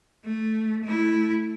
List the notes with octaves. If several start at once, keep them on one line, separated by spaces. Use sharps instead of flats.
A3
A3 E4